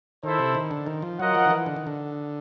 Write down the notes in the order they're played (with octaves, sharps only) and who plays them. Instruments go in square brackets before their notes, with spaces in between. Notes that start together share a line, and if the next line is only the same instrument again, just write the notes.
[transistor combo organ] D#3 [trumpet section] E4 A4 C5
[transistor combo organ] C3
D#3
D3
D#3
F3
[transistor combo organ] F#3 [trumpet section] F4 A#4 D#5 F#5
[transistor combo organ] F3
D#3
E3
D3
D#3
D3